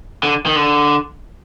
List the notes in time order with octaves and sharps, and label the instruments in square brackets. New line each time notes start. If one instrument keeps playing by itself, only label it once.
[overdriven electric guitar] D3
D#3
D3